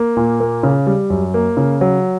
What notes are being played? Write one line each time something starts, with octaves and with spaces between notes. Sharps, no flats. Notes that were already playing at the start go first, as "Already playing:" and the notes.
Already playing: A#3
A#2
A#3
C#3
G3
F#2
A#3
C#3
F#3